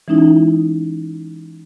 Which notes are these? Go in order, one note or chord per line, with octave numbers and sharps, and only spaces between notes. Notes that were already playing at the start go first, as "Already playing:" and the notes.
E3 G#3 C#4 D#4 E4